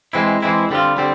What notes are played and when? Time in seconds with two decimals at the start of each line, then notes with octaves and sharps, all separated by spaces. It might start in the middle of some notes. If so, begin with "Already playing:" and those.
0.13 E3 G#3 C4 E4
0.42 E3 G#3 C4 E4
0.70 D3 G3 C4 F4
0.98 D3 G3 C4